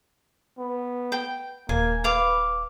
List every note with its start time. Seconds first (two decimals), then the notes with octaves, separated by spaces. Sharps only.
0.58 B3
1.12 G5
1.69 D#1 A#3 G#5
2.04 B4 F5 D6